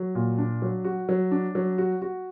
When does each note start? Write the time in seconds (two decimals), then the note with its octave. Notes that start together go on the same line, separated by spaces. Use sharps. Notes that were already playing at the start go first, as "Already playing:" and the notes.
Already playing: F#3
0.15 A#2
0.38 D4
0.62 F#3
0.85 F#4
1.09 F#3
1.31 D4
1.55 F#3
1.78 F#4
2.02 F#4